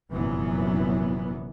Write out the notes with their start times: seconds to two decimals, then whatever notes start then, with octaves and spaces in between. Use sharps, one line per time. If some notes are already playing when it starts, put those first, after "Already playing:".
0.12 F1 F#2 A#2 E3 F#3 B3